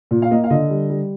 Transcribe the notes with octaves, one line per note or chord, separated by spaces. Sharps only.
A#2
F5
A#3 D#5
F5
D3 D#5
G3
G3